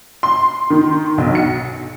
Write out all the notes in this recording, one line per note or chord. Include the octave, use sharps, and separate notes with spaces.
C6
D#3
B1
C#7